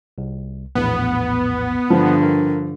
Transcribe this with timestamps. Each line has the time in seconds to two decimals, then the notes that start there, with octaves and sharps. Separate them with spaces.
0.18 C2
0.75 A#1 E2 A2 B3
1.90 G2 D3 F3
2.23 A#4